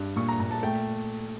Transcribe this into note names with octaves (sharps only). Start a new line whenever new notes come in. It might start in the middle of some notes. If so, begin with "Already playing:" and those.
Already playing: G2
A#2 C#6
A#5
A#2 A#5
A5
A3 G5